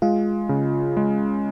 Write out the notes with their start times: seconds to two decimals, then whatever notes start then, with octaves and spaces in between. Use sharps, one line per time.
0.02 G#3 F4
0.49 C#3
0.97 G#3